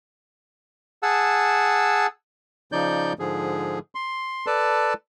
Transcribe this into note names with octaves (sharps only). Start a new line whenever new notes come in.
G#4 F#5 A5 E6
C#3 F3 D#4 D5 G6
G#2 D3 F3 G#4
C6
A4 B4 D5 A5